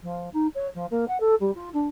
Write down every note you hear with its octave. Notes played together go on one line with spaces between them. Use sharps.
F3
D#4
C#5
F3
A#3
F#5
A4
G3
F4
D4